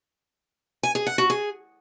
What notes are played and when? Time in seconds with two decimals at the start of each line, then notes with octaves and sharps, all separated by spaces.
0.83 G#5
0.95 G#4
1.07 F#5
1.18 F#4
1.30 G#4